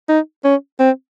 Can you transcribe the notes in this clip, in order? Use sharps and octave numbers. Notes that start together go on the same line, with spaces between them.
D#4
C#4
C4